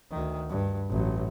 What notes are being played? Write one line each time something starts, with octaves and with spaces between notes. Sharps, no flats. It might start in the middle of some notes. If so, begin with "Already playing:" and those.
D2 D#3
G2
A1 F#3